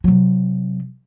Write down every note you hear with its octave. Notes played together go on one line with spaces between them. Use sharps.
C3 F#3